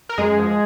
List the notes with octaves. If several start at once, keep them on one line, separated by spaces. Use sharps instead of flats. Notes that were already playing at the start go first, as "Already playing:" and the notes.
A#4
F#2 G#3 G#4
F3